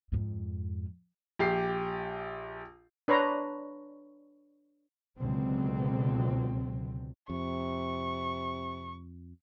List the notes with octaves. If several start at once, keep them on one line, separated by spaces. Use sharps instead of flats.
F2 G#2
A#1 G4 C7
D4 B4 C#5 A#5 C6
C#2 B2 D3 F#3 C4
F2 C3 C#6